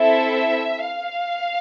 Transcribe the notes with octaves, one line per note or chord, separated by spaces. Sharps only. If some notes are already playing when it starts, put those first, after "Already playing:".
Already playing: C4 E4 A4 E5
F5